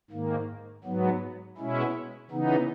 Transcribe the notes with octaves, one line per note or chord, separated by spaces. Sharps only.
G#2 D#3 A#3
G#2 F#3 B3
B2 G#3 C#4 E4
C#3 E3 B3 D#4